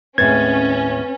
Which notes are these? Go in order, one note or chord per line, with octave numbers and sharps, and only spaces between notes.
D#2 A2 G#3 C4 C#4 B4 G#6 A6